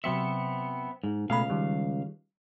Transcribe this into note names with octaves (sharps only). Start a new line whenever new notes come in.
C3 F#3 B3 C4 E5 C#7
G#2
C#2 B2 A3 F5 B5
D#3 G3